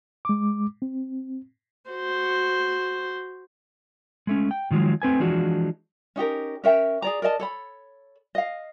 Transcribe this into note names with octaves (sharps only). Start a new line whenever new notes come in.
G#3 D6
C4
F#4 C5
G#3 A3 C#4
G5
A2 D#3 F3 F#3 G#3
A3 C4 B4 G#5
E3 F3 G#3 D4 F#4
C#4 D#4 G4 A#4
C#4 A#4 E5 G5
G#4 D5 A#5
A#4 D5 D#5 A5
A4 C#5 B5
D#5 F5